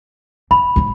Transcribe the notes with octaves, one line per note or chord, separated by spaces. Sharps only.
F#2 B5
G#2 F#3